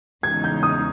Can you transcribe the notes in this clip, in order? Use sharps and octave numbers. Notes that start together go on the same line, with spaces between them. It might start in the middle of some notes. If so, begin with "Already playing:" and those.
E2 C#3 G#3 D#4 G#6
G6
D#6